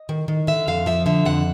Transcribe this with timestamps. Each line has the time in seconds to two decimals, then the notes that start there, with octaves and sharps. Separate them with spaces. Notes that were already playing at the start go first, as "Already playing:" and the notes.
Already playing: D#5
0.09 D#3
0.28 D#3
0.47 D3 E5
0.68 F2 F5
0.86 F3 E5
1.06 D3 E5
1.25 F2 F#5